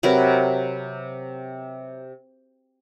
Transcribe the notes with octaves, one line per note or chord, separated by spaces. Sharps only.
C3 F#3 A#4 B4